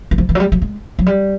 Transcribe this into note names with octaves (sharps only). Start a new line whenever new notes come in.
E3
F3
E3
F#3
G3
F#3
G#3
F#3
G3